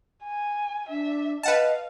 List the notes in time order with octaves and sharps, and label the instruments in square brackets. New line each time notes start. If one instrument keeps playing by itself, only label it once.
[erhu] G#5
[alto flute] D4 [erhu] E5
[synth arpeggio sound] B4 F#5 A5 [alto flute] D#5 [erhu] F5